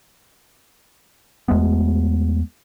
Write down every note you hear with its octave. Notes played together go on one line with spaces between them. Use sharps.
E2 G#3 A3 B3